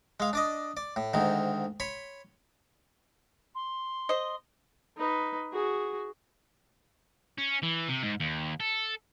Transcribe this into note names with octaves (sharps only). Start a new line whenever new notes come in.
G#3 F5
D4 D5 D#5
D5
A2
D2 G#2 D#3
C#5 B5 C6
C6
C5 D#5
D#4 B4
F#4 G#4
C#4
E3
C3
G#2
D#2
A4